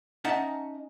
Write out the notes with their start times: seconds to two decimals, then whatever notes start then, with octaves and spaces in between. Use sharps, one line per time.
0.24 C#4 D#4 D#5 E5 F#5 A5